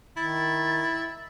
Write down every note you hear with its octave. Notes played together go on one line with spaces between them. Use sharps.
D#3 E4 A6